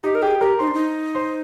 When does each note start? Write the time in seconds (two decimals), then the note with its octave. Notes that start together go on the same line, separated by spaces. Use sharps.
0.03 D#4 G4 D#5
0.15 A#4
0.22 G4 G#4 G5
0.41 G4 A#4 A#5
0.59 D#4 C5 C6
0.67 D4
0.74 D#4
1.15 C5 C6